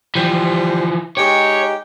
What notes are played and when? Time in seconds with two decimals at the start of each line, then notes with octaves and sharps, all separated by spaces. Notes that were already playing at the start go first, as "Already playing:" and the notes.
0.15 E3 F3 G3 C5
1.17 G#3 D#4 G4 C#5